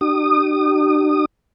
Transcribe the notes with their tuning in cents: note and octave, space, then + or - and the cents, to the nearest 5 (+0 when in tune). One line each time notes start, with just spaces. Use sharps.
D4 +40 G4 -40 D#6 -25